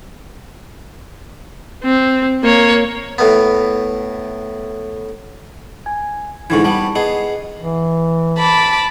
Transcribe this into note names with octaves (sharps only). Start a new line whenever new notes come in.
C4
A#3 C#5
A2 B3
G#5 G#6
G#2 D3 E3 C#6 G#6
G3 B3 A5
B3 G#4 D#5 C7
E3
A5 B5 D6